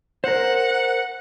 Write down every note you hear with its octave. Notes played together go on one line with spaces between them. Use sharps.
A#4 C5 F#5